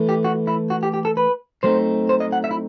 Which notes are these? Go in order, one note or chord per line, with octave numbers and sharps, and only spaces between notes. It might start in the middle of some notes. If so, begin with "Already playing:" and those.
Already playing: E3 A3
G4
F#4
E4
F#4
G4
G4
A4
B4
F#3 A3 C4 D#4 C5
C5
D#5
F#5
E5
E4